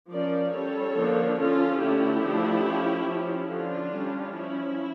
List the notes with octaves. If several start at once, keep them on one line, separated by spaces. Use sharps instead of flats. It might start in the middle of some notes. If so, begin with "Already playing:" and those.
F3 C#4 A#4 D5
G3 C#4 A4 C#5
D3 F3 A#3 D4
F3 C#4 F4 A4
D3 A3 C#4 E4 G4
F3 A3 D4
F3 C#4
F3 C#4
D3 F3 C#4 D4 F4
G3 C#4
F3 C#4 E4